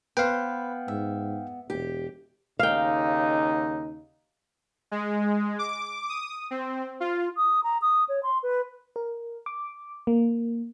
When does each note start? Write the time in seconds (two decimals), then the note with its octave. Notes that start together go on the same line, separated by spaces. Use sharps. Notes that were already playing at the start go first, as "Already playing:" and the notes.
0.17 B3 B4 C5 F5 G5
0.88 G#2 E5
1.70 E1 G4
2.59 D#2 C#3 D#4 F5 G5
4.91 G#3
5.59 D6
6.09 D#6
6.51 C4
7.00 F4
7.37 D#6
7.64 A#5
7.82 D#6
8.09 C#5
8.23 C6
8.43 B4
8.96 A#4
9.46 D6
10.07 A#3